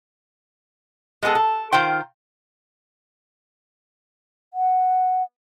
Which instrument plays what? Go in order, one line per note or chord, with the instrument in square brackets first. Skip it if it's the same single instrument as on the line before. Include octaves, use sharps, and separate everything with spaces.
[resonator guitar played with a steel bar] G#3 B3 G#4 A4
A4
D#3 F4 C5 G5
[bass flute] F#5